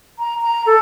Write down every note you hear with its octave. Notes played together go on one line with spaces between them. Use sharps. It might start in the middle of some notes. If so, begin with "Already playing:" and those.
A#5
A#5
A4